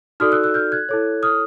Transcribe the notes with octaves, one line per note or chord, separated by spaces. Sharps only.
D#4 F#4 A4 D5 D#6 F6
E6 F#6
E6 F#6
F6 G6
F#6 G#6
E4 A4 C#5
D#6 F6